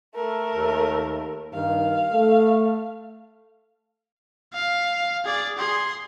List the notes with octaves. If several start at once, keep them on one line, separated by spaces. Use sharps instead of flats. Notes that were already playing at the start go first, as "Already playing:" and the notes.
A3 A#4
D#2
G2 D#3 F5
A3
F5
G#4 D5
G#4 C6